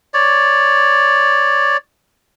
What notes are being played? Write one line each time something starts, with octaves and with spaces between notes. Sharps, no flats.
C#5 D5